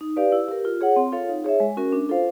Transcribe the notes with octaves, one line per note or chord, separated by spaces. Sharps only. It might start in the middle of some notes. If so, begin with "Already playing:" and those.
D#4
G4 B4 D5 F5
E4
G4 A#4
F4
G#4 C#5 F#5
C4
F4 A4 C#5 F5
D#4
G#4 C#5 E5
G#3
C#4 F#4 A#4
D4
F4 A4 C5 F5